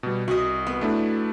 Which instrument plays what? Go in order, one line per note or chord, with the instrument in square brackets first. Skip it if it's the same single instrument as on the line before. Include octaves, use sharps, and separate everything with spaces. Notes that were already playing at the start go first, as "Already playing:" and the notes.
[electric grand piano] B2 G3
[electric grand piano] C2 [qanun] F#4 D#5
[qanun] B3
[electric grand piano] A3 D4 E4